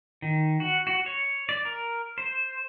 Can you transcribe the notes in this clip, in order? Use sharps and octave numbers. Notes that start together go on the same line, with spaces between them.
D#3
F#4
F#4
C#5
D5
A#4
C5